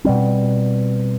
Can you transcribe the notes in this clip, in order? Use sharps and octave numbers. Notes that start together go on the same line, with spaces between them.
B2 G3 C4